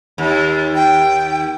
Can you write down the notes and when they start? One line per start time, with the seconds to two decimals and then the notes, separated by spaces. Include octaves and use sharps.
0.18 D#2
0.75 G5